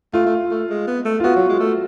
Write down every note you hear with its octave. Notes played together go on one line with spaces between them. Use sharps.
A3 F4
A3
A3
G#3
B3
A3
F4
B3 F#4
F#3
G#3
A3